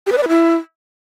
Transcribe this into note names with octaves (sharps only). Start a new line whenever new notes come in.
G4
B4
D5
B4
E4